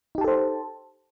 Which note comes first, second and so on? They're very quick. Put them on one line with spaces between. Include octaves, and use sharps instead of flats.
D#4 G4 A5 A4 C5